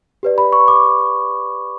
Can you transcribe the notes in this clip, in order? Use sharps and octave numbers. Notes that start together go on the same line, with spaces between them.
G4 B4 D5
B5
C#6
D6